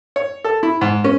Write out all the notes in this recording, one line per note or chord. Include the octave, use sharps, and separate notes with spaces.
C#5
A4
E4
G#2
C#4